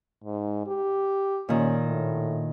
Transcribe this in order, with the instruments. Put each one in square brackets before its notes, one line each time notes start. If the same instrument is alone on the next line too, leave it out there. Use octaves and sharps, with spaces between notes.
[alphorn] G#2
G4
[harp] A#2 D#3 [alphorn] C#4
[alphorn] A2